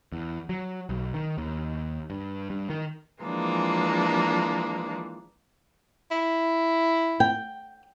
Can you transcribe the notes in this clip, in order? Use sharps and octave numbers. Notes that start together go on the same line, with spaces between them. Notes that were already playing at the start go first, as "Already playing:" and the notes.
E2
F#3
B1
D#3
D#2
G2
G2
D#3
E3 F3 G#3 A#3 D4
E4
G5